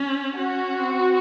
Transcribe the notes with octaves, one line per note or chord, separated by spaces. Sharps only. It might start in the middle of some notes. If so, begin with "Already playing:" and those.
Already playing: C#4
C#4 F#4
C4